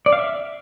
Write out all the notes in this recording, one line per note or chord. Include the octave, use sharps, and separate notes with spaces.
D5
F5
E5